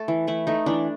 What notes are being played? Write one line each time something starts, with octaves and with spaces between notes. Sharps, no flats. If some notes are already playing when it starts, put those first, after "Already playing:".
Already playing: A3 A4
E3
A3 E4
A3 D#4
E3 D4